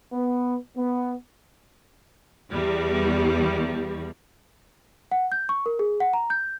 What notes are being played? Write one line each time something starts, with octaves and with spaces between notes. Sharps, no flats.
B3
B3
E2 G3
F#5
G6
C#6
A#4
G#4
F#5
A#5
G6